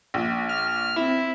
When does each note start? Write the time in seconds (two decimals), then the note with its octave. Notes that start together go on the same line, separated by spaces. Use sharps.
0.14 A#1
0.49 F6
0.96 C4 E4